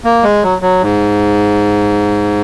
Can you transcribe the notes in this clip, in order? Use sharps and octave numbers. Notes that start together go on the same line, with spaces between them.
A#3
G#3
F#3
F#3
G#2